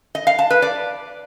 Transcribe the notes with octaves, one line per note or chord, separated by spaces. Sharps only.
D#5
F5
A5
B4
D5